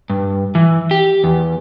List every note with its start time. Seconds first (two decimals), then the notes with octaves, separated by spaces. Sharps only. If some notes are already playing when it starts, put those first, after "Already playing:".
0.10 G2
0.55 E3
0.91 G4
1.24 E2